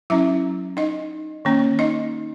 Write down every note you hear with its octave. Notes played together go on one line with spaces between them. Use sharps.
F#3 C#4 E4 E5
D#4 D#5
D#3 A#3 C#4
D#4 D#5